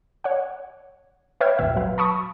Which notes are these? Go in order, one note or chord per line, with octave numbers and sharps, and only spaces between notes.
C#5 F#5
B4 C#5 E5 G5 F6 G#6
G#1 D#2 A#2 E5
F#3 B4 F5
A5 B5 C#6 D#6